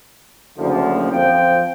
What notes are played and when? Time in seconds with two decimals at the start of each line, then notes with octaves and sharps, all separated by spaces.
0.58 F#1 D2 D3 F3
1.12 F2 F3 C4 G5